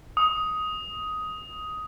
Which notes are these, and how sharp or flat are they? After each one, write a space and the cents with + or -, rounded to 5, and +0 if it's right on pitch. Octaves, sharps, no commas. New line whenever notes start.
D#6 +10